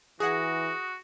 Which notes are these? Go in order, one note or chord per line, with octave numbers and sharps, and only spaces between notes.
E3 F#4 G#4 F#5 D#6 A#6